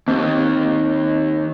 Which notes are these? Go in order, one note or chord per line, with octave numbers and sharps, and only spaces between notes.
D#2 C4